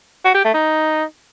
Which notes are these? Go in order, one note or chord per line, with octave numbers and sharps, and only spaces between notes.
F#4
G4
A3
D#4